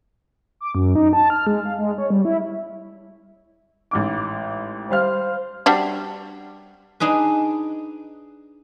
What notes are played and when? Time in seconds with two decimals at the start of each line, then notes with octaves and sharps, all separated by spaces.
0.61 D6
0.75 F#2
0.95 D#4
1.13 A5
1.30 F6
1.47 G#3
1.65 F5
1.78 G#3
1.98 C#5
2.10 G3
2.25 E4
3.91 A1 G#2 D6
4.90 G3 C5 F5 F6
5.66 G3 D4 F#4
7.00 D4 D#4 G#4 B4